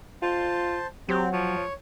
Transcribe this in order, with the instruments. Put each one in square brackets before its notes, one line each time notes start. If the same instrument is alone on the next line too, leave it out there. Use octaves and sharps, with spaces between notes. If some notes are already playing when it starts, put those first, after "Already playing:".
[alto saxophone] F4 [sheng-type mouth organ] C5 A5
[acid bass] F#3 [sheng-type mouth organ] C4 [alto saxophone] G4
[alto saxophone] F3 [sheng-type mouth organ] C#5